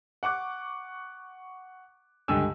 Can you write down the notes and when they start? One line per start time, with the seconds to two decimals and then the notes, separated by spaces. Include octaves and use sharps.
0.23 F#5 C#6 D6 F#6
2.28 C#2 G2 D3 G4 G#5 E6